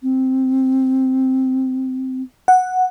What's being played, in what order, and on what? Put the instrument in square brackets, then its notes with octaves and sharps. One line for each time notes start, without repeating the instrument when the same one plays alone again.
[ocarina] C4
[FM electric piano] F#5